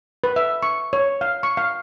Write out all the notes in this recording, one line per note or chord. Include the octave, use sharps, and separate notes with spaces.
B4
E5
C#6
C#5
F5
C#6
F5